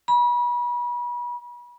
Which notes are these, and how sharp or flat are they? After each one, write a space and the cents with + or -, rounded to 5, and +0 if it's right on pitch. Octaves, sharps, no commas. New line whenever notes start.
B5 -35